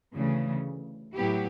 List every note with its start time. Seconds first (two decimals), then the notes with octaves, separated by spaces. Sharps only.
0.15 D2 C#3 E3 A3
1.15 A2 F#3 B3 E4 G4